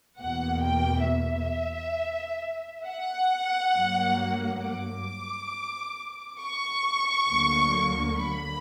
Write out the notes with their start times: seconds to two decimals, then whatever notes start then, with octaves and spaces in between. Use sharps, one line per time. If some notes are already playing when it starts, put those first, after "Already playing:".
0.20 E2 B2 A#3 F#5
0.64 G5
1.09 E5
2.87 F#5
3.75 G2 F#3 A#3
4.63 D6
6.41 C#6
7.29 D2 D3 F#3 A#3
8.19 B5